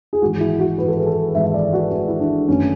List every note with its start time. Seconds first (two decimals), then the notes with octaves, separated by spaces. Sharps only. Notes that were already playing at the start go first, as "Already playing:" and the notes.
0.13 G#4
0.22 G#1 G#2 E3 G#3 F#4
0.40 E4
0.60 F#4
0.78 G#1 G#2 E3 G#3 B4
0.88 A4
0.97 G#4
1.06 A4
1.35 G#1 G#2 E3 G#3 E5
1.46 E5
1.54 D5
1.73 F#4
1.91 G#1 G#2 E3 G#3
2.08 E4
2.20 D4
2.48 G#1 F#2 D3 A3 C#4